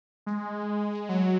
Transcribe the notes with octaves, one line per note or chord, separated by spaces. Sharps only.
G#3
F#3